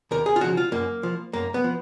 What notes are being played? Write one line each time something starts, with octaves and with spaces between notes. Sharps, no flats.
D#2 A#4
G#4
F4
C#3 F3 F#4
F4
F#2 A#3
F3
F#2 A#3
B3
F3